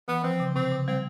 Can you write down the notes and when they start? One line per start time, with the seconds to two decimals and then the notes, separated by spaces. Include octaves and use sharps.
0.08 E3 B3
0.24 F3 C4
0.40 C#3
0.56 C3 C4
0.72 C#3
0.87 G3 C4